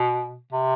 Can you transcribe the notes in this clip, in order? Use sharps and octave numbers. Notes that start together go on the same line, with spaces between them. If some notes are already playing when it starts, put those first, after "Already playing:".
Already playing: B2
C3